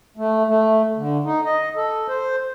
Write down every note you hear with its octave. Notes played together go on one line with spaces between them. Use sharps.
A3
A3
D3
D#4
D#5
A4
C5